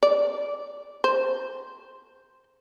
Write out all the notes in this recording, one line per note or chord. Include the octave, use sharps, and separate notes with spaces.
D5
C5